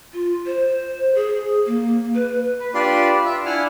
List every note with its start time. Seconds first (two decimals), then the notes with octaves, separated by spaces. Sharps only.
0.13 F4
0.46 C5
1.15 G#4
1.66 A#3
2.15 B4
2.60 B4
2.74 D4 F4 G4 B4 D5 C6
3.25 F4 E5
3.45 D4 E4 F#5 G#5 F6